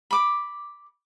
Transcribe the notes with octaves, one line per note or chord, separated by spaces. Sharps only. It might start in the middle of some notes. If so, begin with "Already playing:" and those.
B5 D6